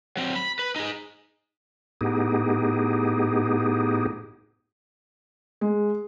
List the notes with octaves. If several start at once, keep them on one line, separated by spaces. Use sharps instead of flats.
F#3 C4
B5
B4
D#4 G#4
A2 B3 D#4 G4 G#4
G#3